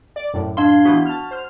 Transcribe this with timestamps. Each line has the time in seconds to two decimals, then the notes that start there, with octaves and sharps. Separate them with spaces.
0.16 D5
0.34 F#2 A2
0.57 D4 F5 C6
0.85 E3 B3 F#4
1.06 A5 F6
1.31 C5 F6